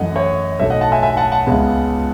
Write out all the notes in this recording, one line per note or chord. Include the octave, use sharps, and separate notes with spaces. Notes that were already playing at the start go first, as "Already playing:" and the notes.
Already playing: F#2 E3 A3 D#5 F#5
C#5 E5
B1 A2 F#3 A3 C#5 E5
D#5 F#5
F#5 A5
E5 G#5
E5 G#5
F#5 A5
F#5 A5
C#2 C#3 G#3 B3